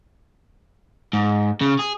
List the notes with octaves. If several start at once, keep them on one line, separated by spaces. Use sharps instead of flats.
G#2
C#3
G#4